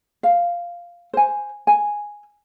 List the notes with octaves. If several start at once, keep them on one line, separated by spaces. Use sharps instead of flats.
F5
C5 G#5
G#5